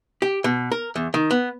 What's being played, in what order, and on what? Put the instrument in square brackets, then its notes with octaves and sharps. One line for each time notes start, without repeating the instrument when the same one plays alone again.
[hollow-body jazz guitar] G4
B2
A#4
E2
D#3
B3